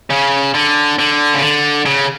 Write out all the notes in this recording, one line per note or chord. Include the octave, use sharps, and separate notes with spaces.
C#3
D3
D3
C#3
D3
C#3